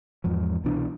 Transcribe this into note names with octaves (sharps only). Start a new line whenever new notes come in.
E2 G#2 F3
C2 B2 E3 D4